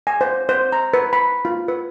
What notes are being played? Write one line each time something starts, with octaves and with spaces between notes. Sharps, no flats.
G#5
C5
C5
A#5
B4
B5
F4
B4